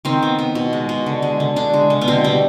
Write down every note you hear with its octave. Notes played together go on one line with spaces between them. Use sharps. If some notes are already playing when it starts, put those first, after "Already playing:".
D#3 C4
B3
B3
B2
G#3
B2
D3
G#3
D3
D3 D4
G#3
D3
B3
B2 C4
G3 B3